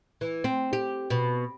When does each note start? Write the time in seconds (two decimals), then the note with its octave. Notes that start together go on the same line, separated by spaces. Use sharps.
0.21 E3
0.44 C4
0.73 G4
1.10 B2